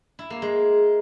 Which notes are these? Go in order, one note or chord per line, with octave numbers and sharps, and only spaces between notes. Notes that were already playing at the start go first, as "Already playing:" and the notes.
E4
A#3
G#3